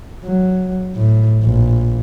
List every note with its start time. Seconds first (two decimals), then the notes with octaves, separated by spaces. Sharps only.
0.25 F#3
0.96 A2
1.44 A#1